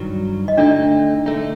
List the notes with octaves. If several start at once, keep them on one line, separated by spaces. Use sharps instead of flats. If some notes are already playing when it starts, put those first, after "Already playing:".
Already playing: G2 D#3 F#3
D#5
D3 A3 D4 D#4 D5
D3 A3 D#4